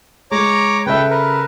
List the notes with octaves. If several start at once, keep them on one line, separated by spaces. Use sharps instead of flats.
G#3 C#5 A#5 D6
C#3 A4 B4 E5 G5
A#4 B4